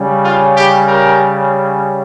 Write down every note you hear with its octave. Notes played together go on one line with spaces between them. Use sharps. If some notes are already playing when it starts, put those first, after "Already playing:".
Already playing: C#3 G3 C#4
F4
G4
G4 A#4